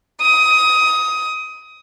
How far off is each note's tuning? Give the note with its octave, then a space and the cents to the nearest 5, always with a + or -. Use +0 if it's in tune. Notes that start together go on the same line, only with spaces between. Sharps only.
D#6 +20